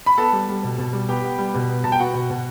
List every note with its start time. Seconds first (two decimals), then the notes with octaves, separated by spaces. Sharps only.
0.06 B5
0.18 B3 A4 A5
0.32 G3
0.49 G3
0.63 B2
0.78 B2
0.93 G3
1.09 B3 G4 G5
1.24 B3
1.38 G3
1.54 B2
1.69 B3
1.84 B2 A5
1.92 G5
1.99 B3 F#4 F#5
2.14 B2
2.30 B2